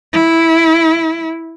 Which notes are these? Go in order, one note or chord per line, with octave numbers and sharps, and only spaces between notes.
E4